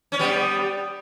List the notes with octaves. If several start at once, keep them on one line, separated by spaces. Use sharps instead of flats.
C#4
G3 B3